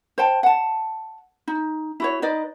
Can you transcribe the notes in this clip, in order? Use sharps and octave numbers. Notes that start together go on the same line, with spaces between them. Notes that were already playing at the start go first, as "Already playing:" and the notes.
C5 G5 A5
F#5 A5
D#4
E4 F#4 C#5
D#4 B4 D5 D#5